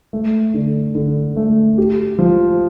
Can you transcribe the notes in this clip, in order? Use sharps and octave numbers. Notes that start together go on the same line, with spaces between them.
A3
D3
D3
A3
G4
F3